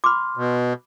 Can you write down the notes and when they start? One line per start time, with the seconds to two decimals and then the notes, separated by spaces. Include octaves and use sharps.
0.04 B5 C6 D6 F6
0.37 B2